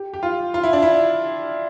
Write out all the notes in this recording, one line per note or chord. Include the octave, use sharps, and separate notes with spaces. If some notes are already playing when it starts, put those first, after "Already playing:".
Already playing: G4
G4
F4
F4
E4
D4
E4